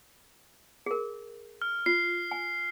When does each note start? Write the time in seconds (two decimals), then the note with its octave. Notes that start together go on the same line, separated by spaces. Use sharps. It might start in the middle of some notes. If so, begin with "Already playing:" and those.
0.86 G#4 A#4
1.62 F6
1.86 F4 C7
2.31 G#5